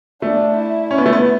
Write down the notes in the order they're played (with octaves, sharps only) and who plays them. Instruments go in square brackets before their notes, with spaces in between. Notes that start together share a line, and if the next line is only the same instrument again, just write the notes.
[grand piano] A3 [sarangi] D4
[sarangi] E4
[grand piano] C#4
B3
A3
B3